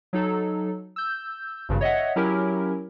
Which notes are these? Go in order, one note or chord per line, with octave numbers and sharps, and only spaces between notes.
F#3 D#4 A4
E6 G6
G#1 G2 C#3
C#5 D#5 E5 F#5
F#3 C#4 E4 G4 A#4